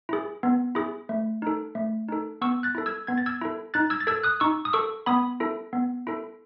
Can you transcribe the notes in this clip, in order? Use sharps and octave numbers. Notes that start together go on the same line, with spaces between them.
E4 G#4
B3
E4 G#4
A3
D#4 A4
A3
D#4 A4
B3 C#6 E6
F#6 A6
E4 A4
E6 G#6
B3 G#6
A6
E6 G#6
E4 A4
D#4 F#6 A6
E6 G#6
A6
A4 E6 G#6
D#6 F#6
D#4 C#6 E6
D#6
A4 C#6 E6
B3 B5 D#6
E4 A4
B3
E4 A4